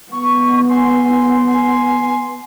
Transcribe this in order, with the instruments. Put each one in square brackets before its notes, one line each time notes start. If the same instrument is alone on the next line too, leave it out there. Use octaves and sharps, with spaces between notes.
[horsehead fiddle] B3 [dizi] C#6
[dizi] G#5 [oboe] C6
[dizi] G#5